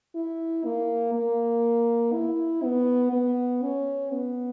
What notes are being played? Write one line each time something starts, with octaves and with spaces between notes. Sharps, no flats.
E4
A#3
A#3
E4
B3
B3
C#4
B3